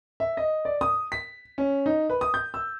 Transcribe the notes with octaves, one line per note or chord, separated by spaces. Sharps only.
E5
D#5
D5
D#6
B6
C#4
D#4
B4
D#6
G6
E6